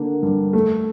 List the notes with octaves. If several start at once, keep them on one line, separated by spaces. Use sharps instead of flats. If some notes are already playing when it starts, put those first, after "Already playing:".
Already playing: D3 A#3
G2
A3